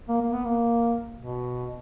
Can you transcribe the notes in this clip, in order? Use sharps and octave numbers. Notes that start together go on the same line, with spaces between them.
A#3
A#3
B3
A#3
B2